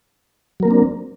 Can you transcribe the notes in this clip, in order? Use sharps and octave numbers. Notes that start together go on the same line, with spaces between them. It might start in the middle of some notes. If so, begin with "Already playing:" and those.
F#3 A#3 C4 D4 A#4